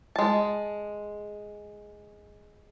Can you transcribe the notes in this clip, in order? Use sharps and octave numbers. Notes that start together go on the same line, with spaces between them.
G#3 A5